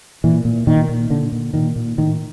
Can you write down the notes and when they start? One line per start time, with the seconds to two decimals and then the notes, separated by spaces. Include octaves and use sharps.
0.24 A#2 E3
0.45 A#2
0.67 A#2 D#3
0.89 A#2
1.10 A#2 D3
1.32 A#2
1.53 A#2 D#3
1.76 A#2
1.98 A2 D#3